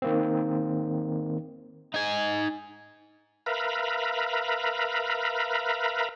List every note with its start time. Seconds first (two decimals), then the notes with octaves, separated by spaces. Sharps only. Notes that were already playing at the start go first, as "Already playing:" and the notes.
0.02 D#3 A#3 C4
1.94 D#4 G#5
3.46 A#4 B4 E5 F5 A#5 B5